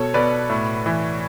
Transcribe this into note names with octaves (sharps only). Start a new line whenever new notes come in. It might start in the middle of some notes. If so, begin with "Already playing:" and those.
Already playing: B2 A4 C#5
B2 B4 D5
A2
E3